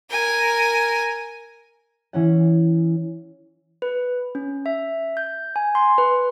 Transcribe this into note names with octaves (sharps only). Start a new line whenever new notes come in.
A#4 G#5
E3 C#4 F#5
B4
C#4
E5
G6
G#5
C6
B4